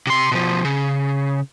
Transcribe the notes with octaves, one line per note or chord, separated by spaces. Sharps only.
C3 C6
B2 F3
C#3